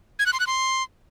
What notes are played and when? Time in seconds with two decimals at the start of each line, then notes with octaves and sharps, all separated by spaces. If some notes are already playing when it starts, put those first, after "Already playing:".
0.19 G#6
0.26 F#6
0.33 C6
0.40 F#6
0.47 C6